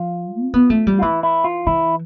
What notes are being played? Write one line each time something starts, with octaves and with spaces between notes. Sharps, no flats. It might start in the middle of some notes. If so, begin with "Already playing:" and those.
Already playing: F3 F4
C4
B3
A3
G3
F4
E3 E4
E4
F4
E3 E4